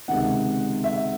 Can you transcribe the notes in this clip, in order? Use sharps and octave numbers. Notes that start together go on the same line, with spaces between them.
C#2 C3 D#3 F#5
E5